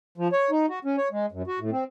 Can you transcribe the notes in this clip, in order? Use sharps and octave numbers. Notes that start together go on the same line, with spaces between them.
F3
C#5
D#4
F#4
C#4
C#5
G#3
F#2
F#4
A2
C4